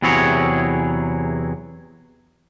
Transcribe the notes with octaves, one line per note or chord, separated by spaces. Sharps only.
E2 C3 F#3 E4 G#4 C#5